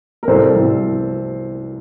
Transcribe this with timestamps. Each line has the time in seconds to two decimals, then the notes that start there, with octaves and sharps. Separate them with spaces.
0.23 A#4
0.28 C2 A4 C5
0.56 C2